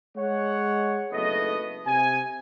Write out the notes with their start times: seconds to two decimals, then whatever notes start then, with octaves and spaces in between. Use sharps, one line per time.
0.16 G#3 C#5 F#5
1.12 F#1 B1 A3 B3 D#5
1.87 C3 G#5